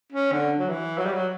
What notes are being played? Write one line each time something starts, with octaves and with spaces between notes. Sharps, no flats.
C#4
D3
F#3
E3
F#3
G3
F#3